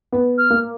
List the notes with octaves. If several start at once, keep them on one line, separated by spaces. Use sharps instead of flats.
B3
F6
A#3